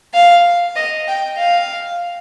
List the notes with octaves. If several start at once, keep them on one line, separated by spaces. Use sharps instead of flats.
F5
D#5
G5
F5